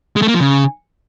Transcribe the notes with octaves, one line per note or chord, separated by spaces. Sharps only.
G#3
A3
A#3
F3
C#3